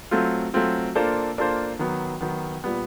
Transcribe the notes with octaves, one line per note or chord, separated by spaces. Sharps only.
F#3 A3 C4 F4
F#3 A3 C4 F4
A#3 D4 F4 A4 C5
A#3 D4 F4 A4 C5
D#3 F#3 B3
D#3 F#3 B3
A#2 G3 B3